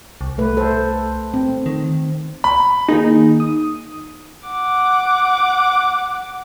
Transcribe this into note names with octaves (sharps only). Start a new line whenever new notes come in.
C2
A3 B4
A4 C5
C4
D#3
B5
D#3 A#3 D#4 G#4
D#6
F#5 D6